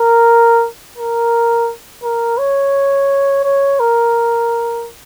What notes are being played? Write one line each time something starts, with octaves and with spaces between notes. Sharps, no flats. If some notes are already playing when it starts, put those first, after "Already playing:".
Already playing: A#4
A#4
A#4
C#5
C#5
A#4